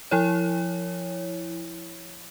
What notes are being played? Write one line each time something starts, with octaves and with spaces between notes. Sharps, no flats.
F3 E4 C#5